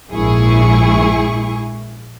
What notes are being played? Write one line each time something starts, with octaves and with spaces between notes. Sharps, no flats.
A#1 G#2 E4 G#4 C#6